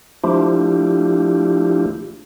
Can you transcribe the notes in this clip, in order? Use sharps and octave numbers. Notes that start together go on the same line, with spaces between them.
F3 A3 D4 E4 F4 G4